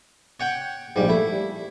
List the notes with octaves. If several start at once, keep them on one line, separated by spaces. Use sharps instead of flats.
C#5 F#5 G5
A#1 G#2 G3
A3 E4
G3